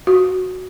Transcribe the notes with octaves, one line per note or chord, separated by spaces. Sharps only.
F#4